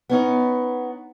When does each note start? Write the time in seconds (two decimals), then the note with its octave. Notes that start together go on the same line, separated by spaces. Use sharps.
0.10 B3 C#4 D#4